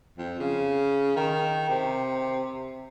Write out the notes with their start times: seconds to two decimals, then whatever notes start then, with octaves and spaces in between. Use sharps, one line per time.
0.18 F2
0.39 C#3
1.16 D#3
1.69 C3